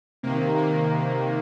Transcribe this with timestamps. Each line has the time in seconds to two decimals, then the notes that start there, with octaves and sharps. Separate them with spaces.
0.23 C3 D#3 A#3
0.57 A#3